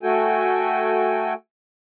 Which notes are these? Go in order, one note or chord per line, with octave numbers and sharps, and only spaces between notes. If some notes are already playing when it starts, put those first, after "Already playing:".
A3 F#4 A4 G5 G#5